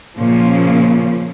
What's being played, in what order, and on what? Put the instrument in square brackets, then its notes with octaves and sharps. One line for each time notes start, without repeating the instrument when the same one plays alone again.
[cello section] A#2 C#3 F3 A#3 C#4